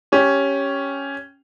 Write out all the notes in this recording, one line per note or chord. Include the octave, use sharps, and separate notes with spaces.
C#4 G4